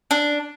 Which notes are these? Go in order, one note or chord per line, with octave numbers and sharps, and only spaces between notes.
D4